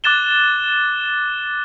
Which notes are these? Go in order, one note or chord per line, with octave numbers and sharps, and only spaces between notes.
D6 F#6 A6 E7 G7